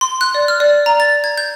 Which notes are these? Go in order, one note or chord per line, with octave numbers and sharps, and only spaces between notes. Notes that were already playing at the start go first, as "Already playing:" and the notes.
C6
F#6
D5
F6
D5
A#5
A6
G#6
G6